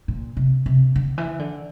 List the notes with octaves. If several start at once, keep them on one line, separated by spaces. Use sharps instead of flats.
A#2
C3
C3
D3
E3
D3